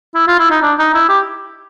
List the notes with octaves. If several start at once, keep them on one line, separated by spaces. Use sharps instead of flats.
E4
F4
E4
D#4
D4
D#4
E4
G4